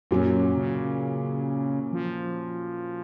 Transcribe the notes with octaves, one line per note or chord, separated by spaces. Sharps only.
F#2 A#2 F#3 C#4
C#3
F3